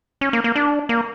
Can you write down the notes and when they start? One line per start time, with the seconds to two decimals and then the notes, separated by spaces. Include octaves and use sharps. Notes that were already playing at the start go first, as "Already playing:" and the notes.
0.21 C#4
0.33 A#3
0.44 A#3
0.56 D4
0.89 A#3